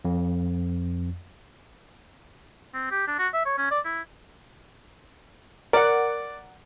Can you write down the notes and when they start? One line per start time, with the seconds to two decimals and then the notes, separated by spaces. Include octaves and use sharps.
0.05 F2
2.74 C4
2.91 G4
3.07 D4
3.19 F#4
3.33 E5
3.46 C#5
3.58 C#4
3.71 D5
3.85 E4
5.73 A#4 D5 F#5